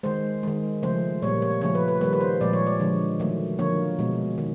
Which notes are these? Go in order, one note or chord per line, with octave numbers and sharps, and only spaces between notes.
D#3 G#3 C5
D#3 G#3
C#3 F3 A3 C5
A#2 G3 A#3 C#5
C#5
C#3 F3 A3 C#5
B4
B4
D#3 G3 A#3 B4
B4
C5
A#2 F3 G#3 D5
C#5
D5
D3 F3 G#3
D#3 F#3 A3
D3 F3 A#3 C#5
B2 G#3
D#3